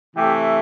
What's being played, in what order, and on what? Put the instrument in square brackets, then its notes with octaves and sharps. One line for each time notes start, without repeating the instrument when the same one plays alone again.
[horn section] C3 E3 A3 G4